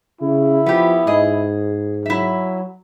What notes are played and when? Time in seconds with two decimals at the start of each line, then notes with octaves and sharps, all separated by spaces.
0.21 C#3 E4
0.66 F3 B3 G4
1.07 G#2 G#4 D#5
2.06 F#3 E4 E5